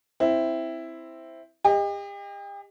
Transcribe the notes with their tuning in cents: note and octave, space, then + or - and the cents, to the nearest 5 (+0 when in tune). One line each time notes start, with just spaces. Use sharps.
C4 +0 E4 +0
G4 +40 D#5 +0